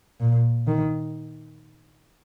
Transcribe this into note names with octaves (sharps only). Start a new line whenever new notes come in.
A#2
D#3